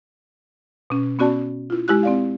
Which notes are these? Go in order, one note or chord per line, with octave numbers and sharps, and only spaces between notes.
B2 C#4
B3 C#4 F#4 D5 A5
E4 F4
G#3 E4 G4 F#6
C4 D5 F5